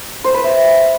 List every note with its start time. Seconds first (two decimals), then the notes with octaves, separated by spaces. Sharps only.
0.24 C5
0.34 B4
0.44 E5